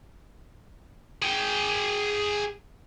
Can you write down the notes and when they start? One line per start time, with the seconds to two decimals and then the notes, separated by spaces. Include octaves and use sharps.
1.22 G#4 G5